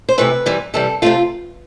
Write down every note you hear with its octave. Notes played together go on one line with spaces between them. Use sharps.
C5
C3 E3 A3 B4
C3 E3 G3
C3 E3 G3 A4
C3 F3 A3 F4